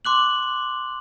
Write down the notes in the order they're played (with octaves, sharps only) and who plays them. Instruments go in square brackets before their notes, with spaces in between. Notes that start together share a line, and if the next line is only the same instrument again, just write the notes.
[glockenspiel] C6 D6 F#6 F#7